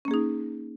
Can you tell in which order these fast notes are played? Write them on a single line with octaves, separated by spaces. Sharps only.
C#4 A#3 G#4 D#4